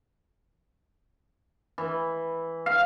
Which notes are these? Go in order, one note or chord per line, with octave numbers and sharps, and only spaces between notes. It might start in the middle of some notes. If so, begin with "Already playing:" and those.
E3
F5